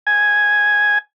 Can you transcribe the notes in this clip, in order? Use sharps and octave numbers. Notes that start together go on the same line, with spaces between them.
G#5